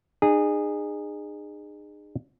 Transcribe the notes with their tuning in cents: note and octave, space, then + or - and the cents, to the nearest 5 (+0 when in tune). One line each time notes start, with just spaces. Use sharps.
D#4 -45 G#4 -15